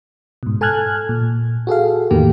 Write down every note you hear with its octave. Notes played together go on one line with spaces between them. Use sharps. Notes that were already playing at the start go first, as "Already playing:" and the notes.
G#2 B2
A4 G#5 A5 F6 F#6 G#6
A#2
F#4 G#4 A4 F5
E2 A2 D#3 A#3 G4